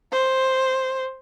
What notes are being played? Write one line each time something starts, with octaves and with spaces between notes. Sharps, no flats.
C5